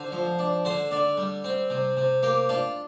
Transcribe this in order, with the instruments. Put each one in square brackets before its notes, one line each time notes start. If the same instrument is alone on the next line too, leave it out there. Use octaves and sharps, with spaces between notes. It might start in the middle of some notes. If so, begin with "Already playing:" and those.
Already playing: [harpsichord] D3 C5
F3
D4
D3 C5
D3 D5
G3
C4
C3
C3
A#3 G4
D4 F4